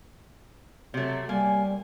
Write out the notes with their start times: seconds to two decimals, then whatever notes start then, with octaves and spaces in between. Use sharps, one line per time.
0.94 C3 F#3 A3
1.29 G3 A#3 G#5